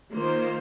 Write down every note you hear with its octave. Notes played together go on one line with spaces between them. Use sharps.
D#3 A#3 F4 C5